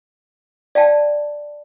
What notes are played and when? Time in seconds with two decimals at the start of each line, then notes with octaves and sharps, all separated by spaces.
0.75 D5 F5 G5 A5